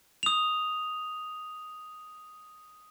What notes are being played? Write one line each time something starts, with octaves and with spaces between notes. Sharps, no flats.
D#6 F7